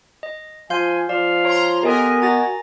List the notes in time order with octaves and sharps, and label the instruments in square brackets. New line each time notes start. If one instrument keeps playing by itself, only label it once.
[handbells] D#5
[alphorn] F3 [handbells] F5 C6 G6 [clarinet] G#5
[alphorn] F3 [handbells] D5 [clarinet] F5
[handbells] C#5 [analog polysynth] A#5 C6
[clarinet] B3 [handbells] G4 A4 [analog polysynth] A#4 D#5 G#5
[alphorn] F#4 [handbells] A#5 A6 A#6